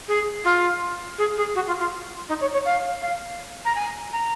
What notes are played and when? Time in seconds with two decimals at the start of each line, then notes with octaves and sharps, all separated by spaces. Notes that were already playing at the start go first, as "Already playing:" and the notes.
0.08 G#4
0.44 F4
1.18 G#4
1.36 G#4
1.55 F#4
1.67 F4
1.79 F4
2.28 D#4
2.41 C#5
2.53 C#5
2.65 F5
3.01 F5
3.65 A#5
3.75 G#5
4.12 A#5